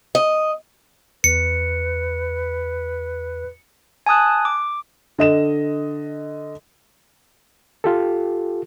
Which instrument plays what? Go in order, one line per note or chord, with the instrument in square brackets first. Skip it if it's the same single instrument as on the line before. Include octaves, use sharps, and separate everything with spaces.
[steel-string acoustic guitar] D#5
[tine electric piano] E2 [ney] B4 [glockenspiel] C#7
[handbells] G#5 A5 D#6 F#6
D6
[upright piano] D3 D#5 E7
[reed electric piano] F4 G4 A4